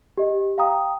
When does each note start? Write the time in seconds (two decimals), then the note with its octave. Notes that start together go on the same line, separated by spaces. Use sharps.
0.17 G4 D#5
0.58 F5 G5 A#5 D#6